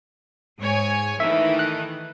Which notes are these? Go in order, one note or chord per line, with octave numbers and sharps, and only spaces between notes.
G#2 C#5 G#5
D#3 E3 A3 E5
F#6